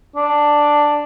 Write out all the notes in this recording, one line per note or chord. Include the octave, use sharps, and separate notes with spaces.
D4